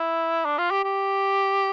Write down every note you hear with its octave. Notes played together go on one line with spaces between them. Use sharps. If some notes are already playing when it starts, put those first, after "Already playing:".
Already playing: E4
D4
F4
G4
G4